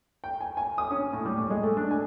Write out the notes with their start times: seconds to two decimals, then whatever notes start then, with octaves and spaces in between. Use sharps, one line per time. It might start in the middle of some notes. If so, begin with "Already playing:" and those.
0.24 G5
0.41 G#5
0.57 G#5
0.78 D#6
0.91 C#4
1.13 A2
1.25 G3
1.38 A2
1.50 G#3
1.63 A3
1.77 D4
1.91 G#5